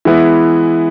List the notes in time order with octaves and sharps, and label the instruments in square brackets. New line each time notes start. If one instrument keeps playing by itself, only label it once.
[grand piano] E3 G#3 B3 E4